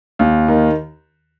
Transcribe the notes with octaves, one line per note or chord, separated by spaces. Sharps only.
D#2
D#3